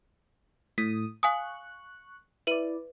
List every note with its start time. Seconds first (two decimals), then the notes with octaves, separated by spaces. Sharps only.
0.78 A2 D#6 B6
1.23 F5 G#5 C#6 D#6 F#6
2.47 E4 B4 D5 D#7 F#7